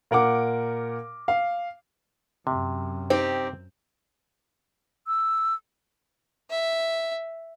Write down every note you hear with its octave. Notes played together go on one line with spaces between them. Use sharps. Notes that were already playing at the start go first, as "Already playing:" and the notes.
A#2 A#4 F#5 D6
F5
F#2 C3
C4 D#4 G4
E6
E5